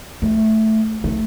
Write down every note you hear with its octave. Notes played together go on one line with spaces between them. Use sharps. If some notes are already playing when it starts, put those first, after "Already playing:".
A3
A3